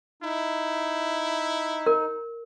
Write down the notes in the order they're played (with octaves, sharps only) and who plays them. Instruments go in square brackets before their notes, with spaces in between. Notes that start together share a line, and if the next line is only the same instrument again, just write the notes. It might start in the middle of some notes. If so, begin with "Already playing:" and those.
[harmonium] D#4 [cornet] E4
[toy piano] A#4